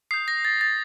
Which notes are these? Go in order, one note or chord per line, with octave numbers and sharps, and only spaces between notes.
D#6 G6 C7
A#6
A6
A6